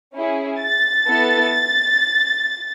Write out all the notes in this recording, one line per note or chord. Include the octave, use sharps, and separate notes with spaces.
C#4 E4 G#4
A6
B3 E4 A4